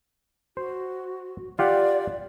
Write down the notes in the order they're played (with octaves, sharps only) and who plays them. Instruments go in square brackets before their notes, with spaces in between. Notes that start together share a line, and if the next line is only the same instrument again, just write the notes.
[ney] F#4 [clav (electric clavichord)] C5
[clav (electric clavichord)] F4 G4 F#5 [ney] D5